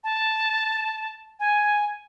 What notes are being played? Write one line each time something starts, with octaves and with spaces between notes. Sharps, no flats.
A5
G#5